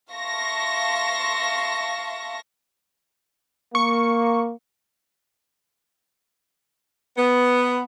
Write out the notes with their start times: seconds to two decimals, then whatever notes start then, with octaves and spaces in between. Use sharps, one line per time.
0.12 E5 F5 A5 C6 C#6 A#6
3.75 A#3 C#6
7.17 B3